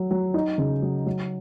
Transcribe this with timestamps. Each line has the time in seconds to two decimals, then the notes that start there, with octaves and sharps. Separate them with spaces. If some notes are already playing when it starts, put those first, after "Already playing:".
Already playing: F#3
0.11 F#3
0.34 D#4
0.58 C#3
0.82 F#3
1.06 F#3